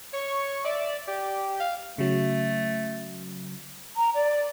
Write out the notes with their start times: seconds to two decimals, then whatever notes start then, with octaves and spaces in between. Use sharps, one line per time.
0.13 C#5 C#6
0.65 D5 E5
1.07 G4 D5
1.60 F5
1.98 C#3 F#3 A3
3.96 A#5
4.15 D5